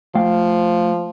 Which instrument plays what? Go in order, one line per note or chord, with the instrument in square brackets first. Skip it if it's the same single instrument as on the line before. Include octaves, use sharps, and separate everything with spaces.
[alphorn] F3 [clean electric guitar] A3 F5 G5